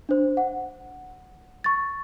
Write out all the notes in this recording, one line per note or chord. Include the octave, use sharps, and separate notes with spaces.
D4 C5
F#5
C#6 A6